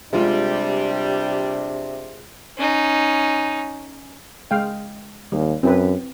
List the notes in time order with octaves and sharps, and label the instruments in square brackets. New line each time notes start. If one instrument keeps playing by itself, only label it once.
[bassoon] C3 [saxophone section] G3 [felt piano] G#3 F4 [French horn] D4
[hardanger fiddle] C#4 D#4
[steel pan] G#3 F5 G5
[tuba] D#2 [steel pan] G3
[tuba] F#2 [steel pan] C4 E4 B4